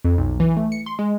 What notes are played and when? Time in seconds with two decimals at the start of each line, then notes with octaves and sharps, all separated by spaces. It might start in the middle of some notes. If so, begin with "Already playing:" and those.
0.04 F2
0.18 B1
0.40 E3
0.57 A3
0.72 C#7
0.86 C6
0.99 G#3